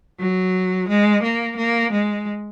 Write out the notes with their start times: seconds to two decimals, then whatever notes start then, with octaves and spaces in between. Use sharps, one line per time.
0.19 F#3
0.88 G#3
1.22 A#3
1.56 A#3
1.91 G#3